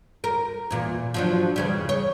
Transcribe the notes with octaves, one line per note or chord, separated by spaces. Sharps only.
A#4
E2 A#2
F3 F#3 D4
E2 C#3 G3
C#5